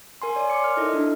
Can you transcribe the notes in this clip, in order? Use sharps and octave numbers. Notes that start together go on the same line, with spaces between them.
A#4 G#5 C6
C#5 D5 G#5
C6 D6 C#7
F6
D#4 E4 A4 A#4 D#5
D4